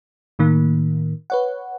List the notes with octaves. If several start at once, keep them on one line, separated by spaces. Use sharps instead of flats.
A2 D#3 A#3
B4 C#5 F#5